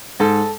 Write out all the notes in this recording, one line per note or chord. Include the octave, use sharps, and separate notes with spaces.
G#2 A4